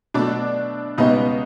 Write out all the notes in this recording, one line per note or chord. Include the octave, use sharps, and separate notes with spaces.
B2 F#3 A3 D4 D5
C#2 B2 G3 B3 D#4 D#5